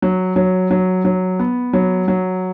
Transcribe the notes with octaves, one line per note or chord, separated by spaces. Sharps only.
F#3
F#3
F#3
F#3
B3
F#3
F#3